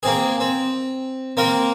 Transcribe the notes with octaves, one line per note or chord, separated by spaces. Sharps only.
A#3 C4 G#4
C4
A#3 C4 A#4